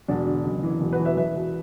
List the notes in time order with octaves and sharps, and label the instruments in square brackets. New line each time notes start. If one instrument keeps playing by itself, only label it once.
[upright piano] E1 D4 F#4
D3
F#1
E3
E1
F#4 B4
E3
B4 E5
E1 B4 E5
B2